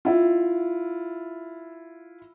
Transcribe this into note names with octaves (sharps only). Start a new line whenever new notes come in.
E4 F4